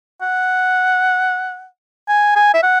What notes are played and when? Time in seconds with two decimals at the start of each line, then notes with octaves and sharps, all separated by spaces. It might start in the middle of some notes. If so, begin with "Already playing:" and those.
0.22 F#5
2.09 G#5
2.36 G#5
2.54 E5
2.63 F#5